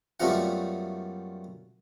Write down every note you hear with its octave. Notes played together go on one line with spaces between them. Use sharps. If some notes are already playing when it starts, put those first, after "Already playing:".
F#2 G3 A3 B3 F4 F#5